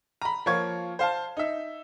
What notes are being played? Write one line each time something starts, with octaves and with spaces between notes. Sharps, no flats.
A#5 B5
F3 A#3 F4 C#5 C#6 G#6
C5 F5 A5
D#4 E5